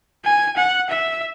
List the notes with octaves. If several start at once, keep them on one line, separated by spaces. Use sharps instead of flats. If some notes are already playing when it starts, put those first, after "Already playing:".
G#5
F#5
E5